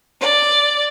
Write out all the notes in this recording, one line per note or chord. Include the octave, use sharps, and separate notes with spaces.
D5